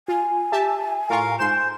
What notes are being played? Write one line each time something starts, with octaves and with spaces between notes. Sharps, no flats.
F4 G#5
G4 E5 A5
A2 F4 A#4 F5 C#6
G#2 C5 C6 E7